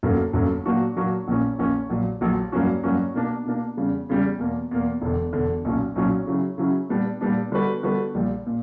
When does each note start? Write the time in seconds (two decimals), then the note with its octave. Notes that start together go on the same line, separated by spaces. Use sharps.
0.03 G1 F#2 D3 F#3 A#3
0.33 G1 F#2 D3 F#3 A#3
0.65 A#2 F#3 A#3 D4 F#4
0.96 A#2 F#3 A#3 D4 F#4
1.28 A#1 A#2 A#3 C#4
1.58 A#1 A#2 A#3 C#4
1.90 A#1 A#2 F#3
2.21 A#1 A#2 F#3
2.52 G2 F#3 A#3 C#4 F#4
2.83 G2 F#3 A#3 C#4 F#4
3.14 B2 A#3 D4
3.45 B2 A#3 D4
3.77 E2 C#3 G3
4.09 E2 C#3 G3
4.39 E2 B2 A#3
4.71 E2 B2 A#3
5.01 E1 E2 D3
5.33 E1 E2 D3
5.65 B1 A#2 F#3 C#4
5.96 B1 A#2 F#3 C#4
6.27 C#3 F#3 C#4 E4
6.58 C#3 F#3 C#4 E4
6.89 A#2 G3 B3 D4
7.21 A#2 G3 B3 D4
7.52 D3 G3 B3 F#4 B4
7.83 D3 G3 B3 F#4 B4
8.15 A#1 A#2 G3
8.46 A#2